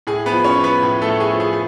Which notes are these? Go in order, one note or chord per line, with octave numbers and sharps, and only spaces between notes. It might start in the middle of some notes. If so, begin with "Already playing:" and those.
A2 G#4
B3 B4
F3
C#4 C#5
F3
B3 B4
A2
A3 A4
A2
G#4
F3
G#4
G#4